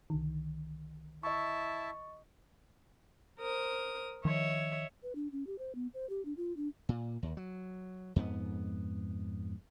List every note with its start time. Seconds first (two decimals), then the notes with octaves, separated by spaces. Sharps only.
0.10 C2 D3 D#3
1.23 E4 D#5 E5 A5 C#6
3.39 A#4 C5 D#6
4.25 D#3 F3 C#5 D#5 E5
5.03 B4
5.15 D4
5.32 C#4
5.47 G4
5.59 C5
5.75 B3
5.94 C5
6.10 G4
6.25 D4
6.37 F4
6.57 D4
6.89 A#2
7.23 D#2
7.37 F#3
8.16 F2 G#2 B3